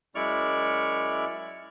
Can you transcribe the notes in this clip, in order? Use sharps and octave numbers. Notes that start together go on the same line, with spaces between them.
F#2 G#3 E4 D5 C#6 F6